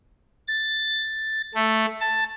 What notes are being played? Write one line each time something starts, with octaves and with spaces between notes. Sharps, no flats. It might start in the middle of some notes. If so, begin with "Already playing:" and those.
A6
A3
A5